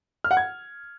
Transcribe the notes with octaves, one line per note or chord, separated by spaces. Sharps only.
F6
F#5
G#6